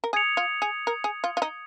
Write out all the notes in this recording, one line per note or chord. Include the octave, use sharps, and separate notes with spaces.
A#4
G#4 D#6 G#6 C#7 F7
F4
G#4
A#4
G#4
F4
F4
D#4